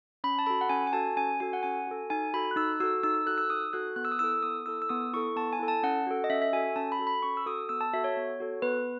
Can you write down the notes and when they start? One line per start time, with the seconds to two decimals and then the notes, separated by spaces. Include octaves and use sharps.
0.24 C#4 B5
0.39 A5
0.46 F#4 A4 B5
0.61 F#5
0.69 C#4 G#5
0.87 G#5
0.93 F#4 A4 A5
1.17 C#4 G#5
1.40 F#4 A4 G#5
1.53 F#5
1.63 C#4 G#5
1.87 F#4 A4
2.10 D#4 G#5
2.34 F#4 A4 B5
2.51 F#6
2.56 D#4 E6
2.80 F#4 A4 E6
3.03 D#4 E6
3.15 E6
3.26 F#4 A4 F#6
3.38 E6
3.50 D#4 D#6
3.73 F#4 A4 F#6
3.96 B3 F#6
4.05 E6
4.12 D#6
4.19 E4 A4 E6
4.43 B3 D#6
4.66 E4 A4 E6
4.82 E6
4.89 B3 D#6
5.13 E4 A4 C#6
5.36 B3 A5
5.53 G#5
5.59 E4 A4
5.68 A5
5.83 C#4 F#5
6.07 F#4 A4
6.24 D#5
6.30 C#4 E5
6.42 E5
6.52 F#4 A4 G#5
6.76 C#4 A5
6.92 B5
6.99 F#4 A4
7.07 B5
7.23 C#4 C#6
7.37 E6
7.46 F#4 A4 D#6
7.69 B3 E6
7.81 A5
7.94 F#4 A4 E5
8.04 C#5
8.17 B3
8.40 F#4 A4
8.62 B3 B4